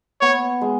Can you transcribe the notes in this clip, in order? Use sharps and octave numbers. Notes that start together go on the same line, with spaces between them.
B3 C#5
G#3